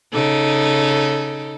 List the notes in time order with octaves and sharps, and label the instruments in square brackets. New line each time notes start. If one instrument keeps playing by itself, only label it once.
[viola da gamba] C#3 D#4 A4